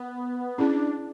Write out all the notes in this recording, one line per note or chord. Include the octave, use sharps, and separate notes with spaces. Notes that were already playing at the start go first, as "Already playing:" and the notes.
Already playing: B3
C#4 D4 E4 G#4